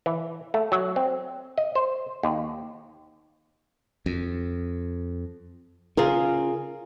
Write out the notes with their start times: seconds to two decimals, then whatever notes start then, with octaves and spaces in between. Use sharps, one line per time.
0.06 E3
0.54 A3
0.72 F#3
0.96 C4
1.58 D#5
1.75 C5
2.23 D#2
4.06 F2
5.97 C#3 F4 G#4 A#4